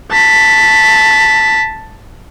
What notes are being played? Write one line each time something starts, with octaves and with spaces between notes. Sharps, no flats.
A5 B6